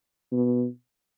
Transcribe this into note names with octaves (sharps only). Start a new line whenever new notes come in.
B2